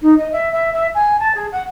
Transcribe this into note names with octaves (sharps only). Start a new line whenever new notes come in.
D#4
D#5
E5
E5
E5
G#5
A5
G#4
F#5